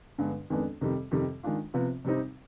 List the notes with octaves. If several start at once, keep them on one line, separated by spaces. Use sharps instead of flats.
G2 D3 G#3 B3
F2 D#3 G#3 B3 D4
F2 C3 D#3 G3
F2 C3 D#3 G3
D#3 G#3 D4 F4
C3 F3 B3 F4
C3 G3 C4 D#4